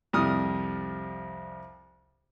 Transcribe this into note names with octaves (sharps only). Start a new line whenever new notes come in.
C2 F2 G3 D#6 F6